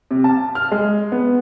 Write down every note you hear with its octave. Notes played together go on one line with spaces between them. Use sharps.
C3
A5
F6
G#3
B3